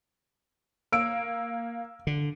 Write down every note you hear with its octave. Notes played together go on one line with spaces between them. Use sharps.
A#3 E6 D7
D3